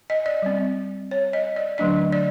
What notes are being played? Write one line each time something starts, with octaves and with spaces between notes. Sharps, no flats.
D#5
D5
G3 C4
C#5
D#5
D5
D3 F#3 A3 D4 D#5
D5